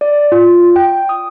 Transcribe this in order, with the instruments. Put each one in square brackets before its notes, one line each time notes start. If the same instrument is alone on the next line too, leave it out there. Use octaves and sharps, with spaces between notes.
[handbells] D5
F4
G5
D#6